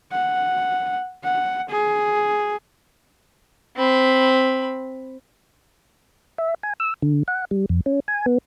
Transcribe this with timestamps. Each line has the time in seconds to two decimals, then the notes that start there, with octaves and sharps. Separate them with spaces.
0.12 F#5
1.24 F#5
1.70 G#4
3.77 C4 B5
6.38 E5
6.63 G#5
6.80 E6
7.02 D3
7.28 F#5
7.51 G3
7.69 F2
7.86 C#4
8.08 G#5
8.26 B3